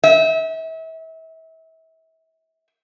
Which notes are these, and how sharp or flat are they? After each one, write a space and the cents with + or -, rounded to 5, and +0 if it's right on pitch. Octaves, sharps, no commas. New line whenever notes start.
E5 -35